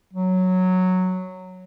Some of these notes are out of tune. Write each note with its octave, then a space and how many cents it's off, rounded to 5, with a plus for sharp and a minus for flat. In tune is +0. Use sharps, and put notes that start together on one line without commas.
F#3 -5